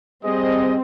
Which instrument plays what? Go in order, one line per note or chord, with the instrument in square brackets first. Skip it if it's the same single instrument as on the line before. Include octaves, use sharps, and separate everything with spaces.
[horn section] G3 G#4 D#5 [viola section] C4